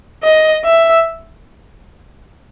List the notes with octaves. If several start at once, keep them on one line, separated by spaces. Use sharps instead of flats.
D#5
E5